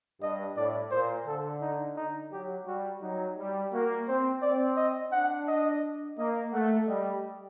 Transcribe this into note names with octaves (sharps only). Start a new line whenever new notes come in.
G2 D#5
A2 D5
A#2 C5
D3 A4
D#4
D#4
F#3 G4
G3 F#4
F#3 D#4
G3
A#3 F#4
C4 C5
C4 D5
D#5
D4 F#5
D#5
A#3 D#5
A3 F#5
G3 D#5